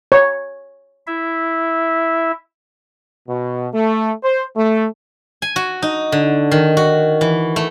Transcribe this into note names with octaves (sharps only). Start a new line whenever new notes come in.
C#5
E4 E5
B2
A3
C5
A3
G#5
F#4
D#4
D3
D#3
F#4
E3
A3